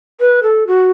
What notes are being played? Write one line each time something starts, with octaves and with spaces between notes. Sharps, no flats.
B4
A4
F#4